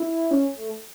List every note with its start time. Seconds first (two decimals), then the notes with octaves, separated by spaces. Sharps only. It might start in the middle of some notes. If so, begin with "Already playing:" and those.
Already playing: E4
0.31 C#4
0.56 A3